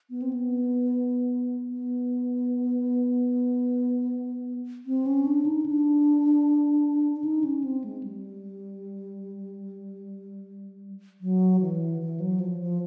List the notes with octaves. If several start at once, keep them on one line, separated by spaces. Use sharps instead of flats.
B3
C4
B3
B3
C4
C#4
D4
D#4
D4
D4
D#4
C#4
C4
G#3
G3
F#3
E3
E3
F#3
F3
F3